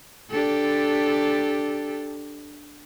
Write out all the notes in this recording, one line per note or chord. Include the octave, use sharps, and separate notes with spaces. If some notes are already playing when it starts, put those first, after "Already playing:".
D4 G4 A4